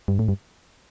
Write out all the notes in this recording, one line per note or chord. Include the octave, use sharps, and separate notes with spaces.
G2
A2
G2